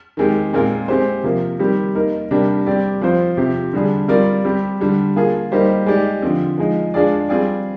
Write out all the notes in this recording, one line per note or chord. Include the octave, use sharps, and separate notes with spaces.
D#3 G#3 C4 G4
A#2 G#3 C4 F4 A#4
G#3 C4 G4 C5
C3 F3 A#3
D#3 G3 C4 G4
A#3 D#4 A#4
C3 G3 A#3 D4 G4
G3 C4 G4 D5
F3 C4 F4 C5
C3 F3 C4 G4
D3 G3 D4 G#4
G3 C4 F4 A#4 D5
G3 C4 G4
D3 G3 D4
A#3 F4 G#4
G3 A#3 D#4 G4 C5
G#3 D#4 G4 D5
D3 F3 C4
F3 G#3 D#4
G#3 D4 F4 G#4 D5
G3 C4 F4 G#4 D5